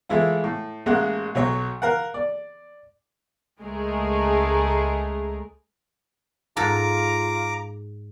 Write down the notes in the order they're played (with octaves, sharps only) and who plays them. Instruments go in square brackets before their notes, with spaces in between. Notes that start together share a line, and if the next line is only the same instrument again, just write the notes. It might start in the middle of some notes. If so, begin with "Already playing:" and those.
[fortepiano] E3 G#3 A3 E4 F4
A2
A1 G#3 A#3 F#5
B1 F#3 C#5
A#4 F5 F#5
D5
[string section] C#2 G#3 A3 G#4 A#4
[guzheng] G#2 A4 A#4 [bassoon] F4 [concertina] A#5 D6